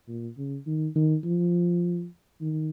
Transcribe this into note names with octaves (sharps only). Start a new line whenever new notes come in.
A#2
C#3
D#3
D#3
F3
D#3